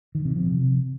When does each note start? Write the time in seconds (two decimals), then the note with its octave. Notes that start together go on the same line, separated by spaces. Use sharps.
0.15 D#3
0.25 C3
0.36 F3
0.46 C3